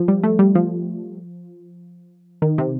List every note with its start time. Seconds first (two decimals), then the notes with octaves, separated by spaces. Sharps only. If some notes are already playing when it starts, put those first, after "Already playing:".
Already playing: F3
0.08 G3
0.23 A3
0.39 G3
0.55 F3
2.42 D#3
2.58 C3